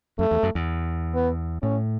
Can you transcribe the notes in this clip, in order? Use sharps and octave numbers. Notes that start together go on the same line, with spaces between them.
F#2 A3
E2
F#2
E2
B3
A2 C#4